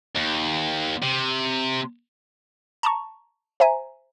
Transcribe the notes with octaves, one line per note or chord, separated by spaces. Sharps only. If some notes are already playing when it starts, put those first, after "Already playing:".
D#2
C3
A5 A#5 C#6
C5 E5 G#5 A#5